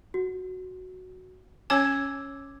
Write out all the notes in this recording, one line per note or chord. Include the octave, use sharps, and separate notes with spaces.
F#4
C#4 C#5 G#5 D6 E6 G#6